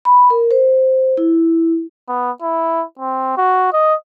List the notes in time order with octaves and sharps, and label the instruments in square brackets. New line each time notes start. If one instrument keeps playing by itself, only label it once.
[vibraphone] B5
A#4
C5
E4
[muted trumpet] B3
E4
C4
F#4
D#5